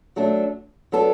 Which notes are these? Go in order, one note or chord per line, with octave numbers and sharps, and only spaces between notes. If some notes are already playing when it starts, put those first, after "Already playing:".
F#3 A3 D4 A4
F#3 B3 D4 A4